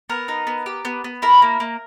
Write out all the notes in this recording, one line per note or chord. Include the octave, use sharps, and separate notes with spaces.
B3 A#4
D#4
B3
G4
B3
B3
E4 A#4
A#3
A#3